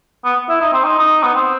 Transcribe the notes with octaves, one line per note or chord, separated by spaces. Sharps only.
B3
E4
D#4
C4
D#4
D#4
B3
C4